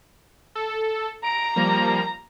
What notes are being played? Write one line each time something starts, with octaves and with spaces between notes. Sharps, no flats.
A4
A#5 D7
F3 G3 A#3